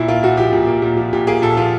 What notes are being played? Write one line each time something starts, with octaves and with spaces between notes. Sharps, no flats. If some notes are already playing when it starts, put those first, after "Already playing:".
Already playing: A#2 E4
A#3 F4
A#2 F#4
F3 G4
A#2
A#3
A#2
F3
A#2 G4
A#3 G#4
A#2 A4
F3 F4